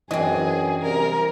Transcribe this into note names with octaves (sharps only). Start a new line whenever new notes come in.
F#2 E3 C4 D4 G#4 D5 D#5
C2 A#4